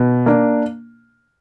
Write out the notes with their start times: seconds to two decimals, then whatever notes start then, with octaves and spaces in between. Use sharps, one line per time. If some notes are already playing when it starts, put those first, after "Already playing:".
Already playing: B2
0.26 A#3 D4